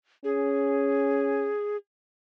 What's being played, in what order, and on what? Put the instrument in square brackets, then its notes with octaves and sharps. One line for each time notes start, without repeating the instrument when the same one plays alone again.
[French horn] C#4 [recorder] G#4